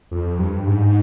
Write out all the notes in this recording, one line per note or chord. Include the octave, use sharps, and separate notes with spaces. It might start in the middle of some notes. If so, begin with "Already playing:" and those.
F2
G2
G#2